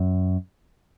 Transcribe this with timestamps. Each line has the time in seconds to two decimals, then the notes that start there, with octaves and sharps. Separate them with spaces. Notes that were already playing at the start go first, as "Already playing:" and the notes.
Already playing: F#2